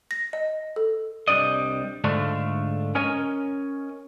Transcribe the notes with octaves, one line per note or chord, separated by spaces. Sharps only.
A#6
D#5
A4
C2 G3 D4 D5 D#5
G#2 D3 A3 D4 F4
C#4 A#4 C#5 D#5 G#5